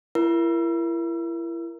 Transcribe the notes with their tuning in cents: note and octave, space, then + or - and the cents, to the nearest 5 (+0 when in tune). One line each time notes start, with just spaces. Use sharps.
E4 +30 A#4 +10